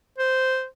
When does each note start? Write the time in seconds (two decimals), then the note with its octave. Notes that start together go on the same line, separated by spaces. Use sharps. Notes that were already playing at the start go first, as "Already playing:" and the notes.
0.18 C5